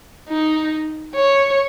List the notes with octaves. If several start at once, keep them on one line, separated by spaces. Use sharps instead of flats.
D#4
C#5